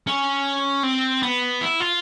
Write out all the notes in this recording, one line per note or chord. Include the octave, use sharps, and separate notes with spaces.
C#4
C4
B3
E4
F4